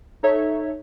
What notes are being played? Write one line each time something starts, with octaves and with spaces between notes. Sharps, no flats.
D#4 A4 C#5 E5